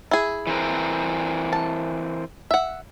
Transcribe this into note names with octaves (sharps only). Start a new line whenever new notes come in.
E4 G#4
E3 C4 A#4
A5
E5 F#5